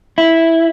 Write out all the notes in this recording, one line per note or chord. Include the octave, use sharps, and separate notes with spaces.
E4